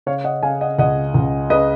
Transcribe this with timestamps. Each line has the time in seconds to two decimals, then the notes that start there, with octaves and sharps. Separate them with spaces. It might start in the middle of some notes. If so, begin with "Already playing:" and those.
0.06 C#3 C#5 F5
0.24 D#5 F#5
0.43 C#3 F5 G#5
0.61 D#5 F#5
0.78 C#2 D#5 F#5
1.14 C#2
1.50 C#3 B4 D#5